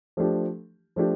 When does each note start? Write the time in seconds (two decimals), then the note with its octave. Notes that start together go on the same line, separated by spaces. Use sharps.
0.17 F3 A3 D4 G4
0.96 F3 A3 D4 G4